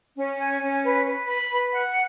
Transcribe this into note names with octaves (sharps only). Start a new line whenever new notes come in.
C#4
G#5
C#4
B4
B4
B5
B4
F#5